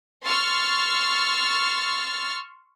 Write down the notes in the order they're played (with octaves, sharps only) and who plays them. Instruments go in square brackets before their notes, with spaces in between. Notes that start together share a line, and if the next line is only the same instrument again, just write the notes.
[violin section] C6 C#6 E6 F6 A6